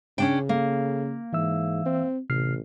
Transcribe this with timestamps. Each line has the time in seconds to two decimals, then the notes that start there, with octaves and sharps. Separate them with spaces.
0.18 C#3 C#4 D4 G5
0.49 A#3 A4
1.33 G#2 E3 E5 E6
1.86 C4
2.30 A1 C3 F6 C7